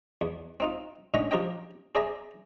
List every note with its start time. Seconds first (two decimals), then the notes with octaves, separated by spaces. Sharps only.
0.21 E2
0.60 C4 D#4 F4
1.14 A2 D3 C#4 D#4 A#5 C#6
1.31 F3 G4 A#4 C5 D#5 G5
1.95 G#4 C5 D5 E5 G#5 A#5